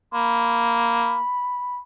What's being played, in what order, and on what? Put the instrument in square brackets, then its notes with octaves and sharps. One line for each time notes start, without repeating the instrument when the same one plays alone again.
[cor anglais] A#3 [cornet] B5